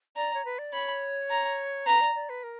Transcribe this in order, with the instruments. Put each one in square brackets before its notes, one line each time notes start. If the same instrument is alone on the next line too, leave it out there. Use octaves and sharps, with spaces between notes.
[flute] D5 [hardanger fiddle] A#5
[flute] C#5
B4
D5
[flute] C#5 [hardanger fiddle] B5
[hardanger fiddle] A#5
[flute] B4 [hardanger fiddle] A#5
[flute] D5
D5
B4
A#4